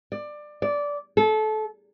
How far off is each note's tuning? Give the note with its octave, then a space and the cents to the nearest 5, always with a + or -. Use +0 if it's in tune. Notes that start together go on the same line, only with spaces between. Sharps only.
D5 +20
D5 -15
A4 -25